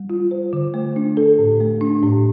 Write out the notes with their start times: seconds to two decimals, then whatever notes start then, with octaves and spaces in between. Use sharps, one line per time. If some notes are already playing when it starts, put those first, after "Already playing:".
Already playing: G3
0.10 F4
0.31 C5
0.53 D3
0.74 A3
0.96 D4
1.17 A4
1.38 A2
1.61 A3
1.81 D4
2.03 A2